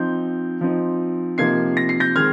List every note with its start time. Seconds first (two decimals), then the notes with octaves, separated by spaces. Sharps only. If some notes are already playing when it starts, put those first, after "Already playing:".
Already playing: F3 C4 D#4 G6
0.61 F3 C4 D#4
1.38 C3 F3 A#3 D#4 G#6 C7
1.77 A#6
1.89 C7
2.00 G6 A#6
2.16 D#3 G#3 C4 F6 G#6